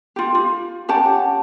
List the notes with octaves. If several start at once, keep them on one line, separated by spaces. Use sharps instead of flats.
F4 G4
F4
C#4 G4 F#5 A5